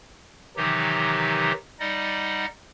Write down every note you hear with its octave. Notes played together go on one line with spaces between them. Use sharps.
C3 D#3 E3 F#3 D#4 G4
G3 D#4 D5 D#5 F#5